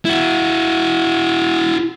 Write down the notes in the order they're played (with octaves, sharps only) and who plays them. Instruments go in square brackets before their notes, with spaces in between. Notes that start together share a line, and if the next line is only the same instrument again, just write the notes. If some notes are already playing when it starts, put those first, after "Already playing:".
[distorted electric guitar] E4 F#4